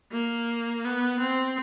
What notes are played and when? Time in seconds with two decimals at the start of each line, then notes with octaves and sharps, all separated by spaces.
0.12 A#3
0.85 B3
1.20 C4